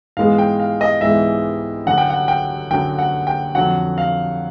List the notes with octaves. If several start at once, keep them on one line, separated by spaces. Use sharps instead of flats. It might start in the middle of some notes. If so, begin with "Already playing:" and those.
G#2 E3 G#3 B3 F5
G5
F5
D#5
G#2 E3 G#3 B3 E5
F#2 D3 F#3 F#5
G5
F#5
G5
F#2 D3 F#3 G5
F#5
G5
F2 D3 F#3 F#5
F5